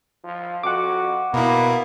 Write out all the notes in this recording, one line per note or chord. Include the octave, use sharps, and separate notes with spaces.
F3
F2 F#4 F#5 D6
B2 A#3 B3 E4